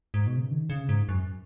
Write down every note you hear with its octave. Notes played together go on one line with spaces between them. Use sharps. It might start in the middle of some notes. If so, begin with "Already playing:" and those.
G#2
B2
C#3
D#3
C#3
G#2
F#2